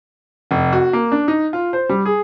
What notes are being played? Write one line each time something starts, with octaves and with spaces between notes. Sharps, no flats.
F1
F#4
A#3
D4
D#4
F4
C5
G3
G#4